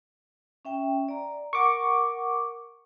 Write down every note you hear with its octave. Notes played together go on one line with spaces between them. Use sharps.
C#4 E5 G5
D5 A#5
A#4 F#5 C#6 D6